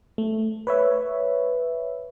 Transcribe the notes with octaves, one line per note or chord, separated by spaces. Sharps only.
A3
B4 C#5 E5